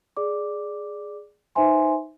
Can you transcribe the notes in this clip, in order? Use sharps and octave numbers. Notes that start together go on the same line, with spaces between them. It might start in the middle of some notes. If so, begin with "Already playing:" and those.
G#4 D5 D6
D#4 B4 C5 E5 G#5 C6